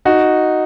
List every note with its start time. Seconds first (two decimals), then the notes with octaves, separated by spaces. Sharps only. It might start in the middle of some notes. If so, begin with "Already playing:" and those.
0.05 D#4 F#4